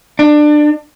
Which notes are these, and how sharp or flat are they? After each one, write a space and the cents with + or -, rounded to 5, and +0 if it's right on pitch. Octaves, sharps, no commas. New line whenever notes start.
D4 +20